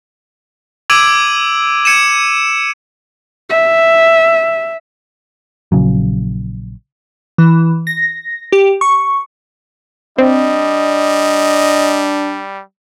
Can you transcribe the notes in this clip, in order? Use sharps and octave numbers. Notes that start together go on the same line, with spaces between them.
D6 E6 G#6 D7 D#7 F#7
G#6 C#7 D#7 E7
E5
A#1 C#3 F#3
E3
A#6
G4
C#6
G3 C4 D4 D#5